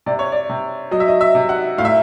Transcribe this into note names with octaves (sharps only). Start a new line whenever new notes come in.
C3 D5
C#5
D5
C3
F#3 D#5
E5
D#5
E5
C3
F#5
A2 F5
E5